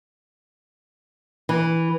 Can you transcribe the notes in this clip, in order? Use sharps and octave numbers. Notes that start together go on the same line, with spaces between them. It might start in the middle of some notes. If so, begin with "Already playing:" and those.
E3